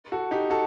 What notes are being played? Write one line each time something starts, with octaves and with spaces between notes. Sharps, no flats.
F#4 A4
D#4 G4
F#4 A4